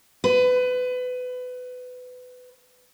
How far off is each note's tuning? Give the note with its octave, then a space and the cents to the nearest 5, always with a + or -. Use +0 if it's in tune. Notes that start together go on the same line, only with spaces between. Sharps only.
B4 +25